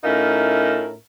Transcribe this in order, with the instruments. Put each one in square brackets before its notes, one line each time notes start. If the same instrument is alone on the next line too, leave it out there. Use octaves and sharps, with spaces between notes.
[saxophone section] A2 C#4 D#4 F4 A#4 E5